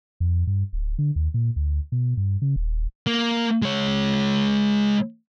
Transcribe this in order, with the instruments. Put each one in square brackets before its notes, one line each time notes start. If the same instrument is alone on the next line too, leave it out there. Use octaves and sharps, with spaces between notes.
[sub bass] F2
G2
D1
D3
D#2
A#2
D2
B2
G2
C#3
D#1
[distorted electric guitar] A#3
G#3 C#5